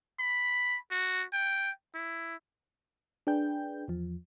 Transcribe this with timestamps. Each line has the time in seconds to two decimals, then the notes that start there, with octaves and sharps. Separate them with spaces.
0.20 B5
0.91 F#4
1.33 G5
1.94 E4
3.27 D4 G#4 B4 G5 G6
3.88 E2 F3